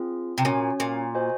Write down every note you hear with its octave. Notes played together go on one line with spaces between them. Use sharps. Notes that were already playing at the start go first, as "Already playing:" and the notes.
Already playing: C4 F4 G#4
C3
A#2 C#4 F#4 C#5 G#5
A#2
F#4 C5 D#5 G#5